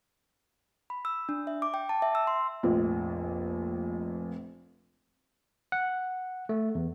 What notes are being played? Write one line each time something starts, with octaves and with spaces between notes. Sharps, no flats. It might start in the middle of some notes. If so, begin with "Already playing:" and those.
B5
E6
D4
E5
D6
G5
A5
E5
E6
C6
F1 A#1 F2
F#5
A3
E2